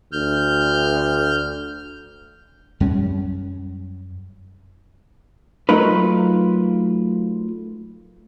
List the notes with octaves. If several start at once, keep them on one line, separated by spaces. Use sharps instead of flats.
D2 F6 G6
F#2 G3 C#4
F#3 A3 D#4 F4 A#4 B4